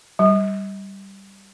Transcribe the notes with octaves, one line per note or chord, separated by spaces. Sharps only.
G3